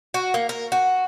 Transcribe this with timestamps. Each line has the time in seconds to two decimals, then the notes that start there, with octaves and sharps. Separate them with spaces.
0.14 F#4
0.34 A#3
0.49 A#4
0.72 F#4